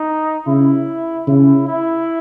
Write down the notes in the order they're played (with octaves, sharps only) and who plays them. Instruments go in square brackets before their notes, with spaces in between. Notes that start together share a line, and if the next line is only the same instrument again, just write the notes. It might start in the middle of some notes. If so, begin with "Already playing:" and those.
Already playing: [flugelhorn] D#4
[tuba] C#3 [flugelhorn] E4
[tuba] C#3 [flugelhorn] E4
[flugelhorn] E4